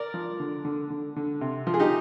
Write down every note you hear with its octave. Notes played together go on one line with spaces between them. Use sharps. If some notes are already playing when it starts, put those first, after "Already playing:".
Already playing: A#4 D5
F3
D3
D3
D3
D3
C3
F3
G#4
D#4 G4